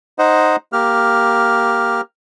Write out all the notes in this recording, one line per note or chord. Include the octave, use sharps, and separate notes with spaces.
D#4 C5 D#5 F#5
A#3 G4 F6